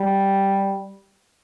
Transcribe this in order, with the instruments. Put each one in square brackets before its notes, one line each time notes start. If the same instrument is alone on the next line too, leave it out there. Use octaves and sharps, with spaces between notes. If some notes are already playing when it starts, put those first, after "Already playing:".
Already playing: [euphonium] G3